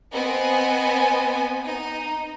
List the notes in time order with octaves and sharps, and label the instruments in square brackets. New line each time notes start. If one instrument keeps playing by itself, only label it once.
[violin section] B3 C4 D#5 G#5
D#4